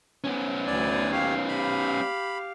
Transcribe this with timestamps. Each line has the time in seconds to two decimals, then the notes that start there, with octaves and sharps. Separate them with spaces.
0.24 B3 C#4
0.67 D2 D5 G#5
1.11 D#2 D#3 G4 C#5 F5
1.48 G4 F5 B5